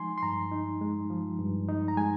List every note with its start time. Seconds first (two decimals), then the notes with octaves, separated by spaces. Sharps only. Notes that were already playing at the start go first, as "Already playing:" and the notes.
Already playing: F3 G#3 D#4 G#5 C6
0.18 C6
0.22 G2 A#5
0.52 D#4
0.81 G#3
1.10 F3
1.39 G2
1.68 D#4
1.88 A#5
1.97 G#3 G#5